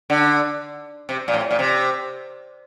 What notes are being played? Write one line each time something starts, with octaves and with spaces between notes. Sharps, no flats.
D3
C3
A#2
A2
A#2
C3